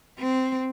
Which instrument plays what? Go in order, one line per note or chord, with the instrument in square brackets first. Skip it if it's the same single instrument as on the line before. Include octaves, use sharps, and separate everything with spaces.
[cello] C4